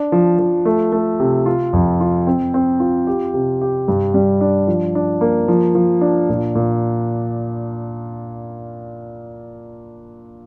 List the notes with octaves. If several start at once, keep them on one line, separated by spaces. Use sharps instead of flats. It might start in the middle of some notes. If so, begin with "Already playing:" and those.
Already playing: D4
F3
F3
A3
A3
C3
F4
F2
F4
C4
C4
F4
G4
C3
G4
G2
G3
D4
F3
D4
A#3
F3
F3
D4
A#2
A#2